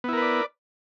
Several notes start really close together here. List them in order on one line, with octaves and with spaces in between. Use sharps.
B3 E4 A#4 B4 D5